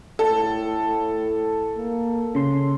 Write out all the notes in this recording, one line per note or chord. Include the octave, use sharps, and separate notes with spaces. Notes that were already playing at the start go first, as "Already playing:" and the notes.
A2 A4
A#3
C#3 C#4 C6